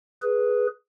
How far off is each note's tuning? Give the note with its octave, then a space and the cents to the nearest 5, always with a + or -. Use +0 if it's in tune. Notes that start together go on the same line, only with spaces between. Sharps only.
G#4 +5 B4 -5